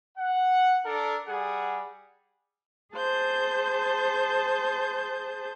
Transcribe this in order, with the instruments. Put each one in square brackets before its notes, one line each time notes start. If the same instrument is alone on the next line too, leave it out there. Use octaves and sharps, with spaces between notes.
[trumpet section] F#5
D4 A4 A#4
G3 G#4 F#5
[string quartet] G#4 C5 A5 G6